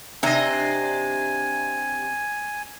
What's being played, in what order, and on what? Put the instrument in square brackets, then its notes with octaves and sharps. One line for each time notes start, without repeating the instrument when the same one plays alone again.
[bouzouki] C3 E5 [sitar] D4 D#5 [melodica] G#5